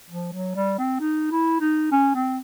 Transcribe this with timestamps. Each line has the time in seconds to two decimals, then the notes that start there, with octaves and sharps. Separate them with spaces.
0.10 F3
0.33 F#3
0.56 G3
0.78 C4
1.00 D#4
1.31 E4
1.60 D#4
1.92 C#4
2.14 C4